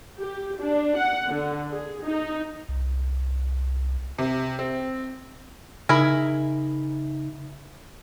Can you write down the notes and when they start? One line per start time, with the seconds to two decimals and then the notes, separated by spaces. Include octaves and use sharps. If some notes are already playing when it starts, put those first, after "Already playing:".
0.19 G4
0.60 D4
0.97 F#5
1.28 D3
1.72 G#4
2.04 D#4
2.69 C2
4.19 C3
4.59 C4
5.89 C#3 D#4 E4 G#4 A#4